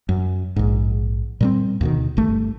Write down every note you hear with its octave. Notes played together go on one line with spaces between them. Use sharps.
F#2
A#1 G#2
A#2 G3 C4
D2 B2 D#3
G1 A3